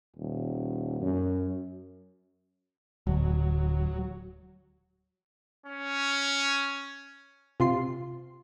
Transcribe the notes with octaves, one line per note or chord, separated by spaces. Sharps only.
D#1
F#2
D1 F#3
C#4
C3 F4 C6